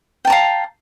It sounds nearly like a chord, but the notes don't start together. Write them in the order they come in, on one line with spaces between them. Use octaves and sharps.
G5 A5 A#5 F5